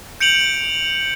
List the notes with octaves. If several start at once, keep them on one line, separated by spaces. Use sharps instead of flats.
G6 C#7 D7 F7 F#7